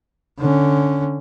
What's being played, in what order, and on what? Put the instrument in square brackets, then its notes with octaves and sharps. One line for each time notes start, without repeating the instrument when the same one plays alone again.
[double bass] D3 C#4